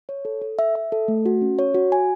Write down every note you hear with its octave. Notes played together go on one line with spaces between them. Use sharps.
C#5
A4
A4
E5
E5
A4
A3
F#4
C#4
C#5
F#4
G#5